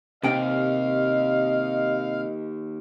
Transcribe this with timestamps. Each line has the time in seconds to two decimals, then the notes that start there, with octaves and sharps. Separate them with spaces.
0.23 D#2 C3 D#5 F5 G5